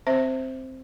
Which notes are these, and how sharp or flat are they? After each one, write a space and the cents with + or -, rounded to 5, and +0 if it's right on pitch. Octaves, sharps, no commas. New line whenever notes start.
C4 +0 C5 +0 E5 +0